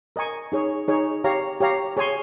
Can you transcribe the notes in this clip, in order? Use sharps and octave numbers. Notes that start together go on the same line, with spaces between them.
A#4 D#5 G#5 C#6
D#4 G#4 C#5
D#4 G#4 C#5
G4 C#5 F5 A#5
G4 C#5 F5 A#5
G#4 C#5 G#5 C6